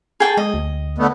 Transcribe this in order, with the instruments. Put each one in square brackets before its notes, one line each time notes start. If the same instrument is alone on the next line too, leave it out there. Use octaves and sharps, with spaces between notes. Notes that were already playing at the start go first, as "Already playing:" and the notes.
[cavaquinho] G#4 G5 A5
[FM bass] G#3 [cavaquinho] D#5
[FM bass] D2
[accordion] D3 A3 B3